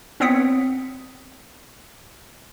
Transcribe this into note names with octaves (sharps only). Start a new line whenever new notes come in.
B3 C4 C#5 D#6 B6 C#7